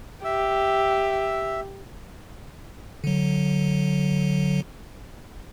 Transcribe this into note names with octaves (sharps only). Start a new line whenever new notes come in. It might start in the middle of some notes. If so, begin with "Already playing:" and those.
G4 E5 E6
D3 F#3